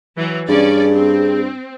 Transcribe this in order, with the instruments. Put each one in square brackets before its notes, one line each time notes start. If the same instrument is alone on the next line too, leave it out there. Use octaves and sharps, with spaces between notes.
[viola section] E3 F#3
[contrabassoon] G2 [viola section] C#4 D5 [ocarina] G#4
[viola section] C4